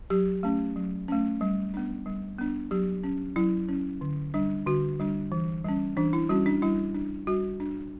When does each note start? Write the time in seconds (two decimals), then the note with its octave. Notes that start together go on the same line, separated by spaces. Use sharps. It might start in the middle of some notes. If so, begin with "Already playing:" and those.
0.10 F#3 G4
0.43 A3 C#4
0.76 F#3
1.08 A3 C#4
1.41 G3
1.74 B3 D4
2.06 G3
2.38 B3 D4
2.71 F#3 G4
3.04 C#4
3.36 F#3 E4
3.69 C#4
4.01 D3
4.34 G3 D4
4.67 D3 F#4
4.99 G3 D4
5.32 E3
5.65 G3 C#4
5.97 E3 D4
6.13 E4
6.29 G3 C#4 F#4
6.46 D4
6.62 G3 E4
6.95 D4
7.27 G3 F#4
7.60 D4